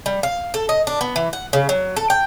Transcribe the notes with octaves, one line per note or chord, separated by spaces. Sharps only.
G3
F5
A4
D#5
D4
B3
E3
F#5
C#3
F#3
A4
G5